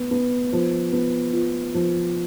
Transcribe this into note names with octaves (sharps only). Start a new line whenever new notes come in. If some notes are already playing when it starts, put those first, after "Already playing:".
Already playing: B3
B3
F3
B3
F4
F3